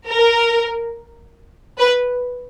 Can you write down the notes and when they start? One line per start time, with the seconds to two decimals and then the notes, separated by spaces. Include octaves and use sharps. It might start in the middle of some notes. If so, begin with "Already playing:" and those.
0.11 A#4
1.79 B4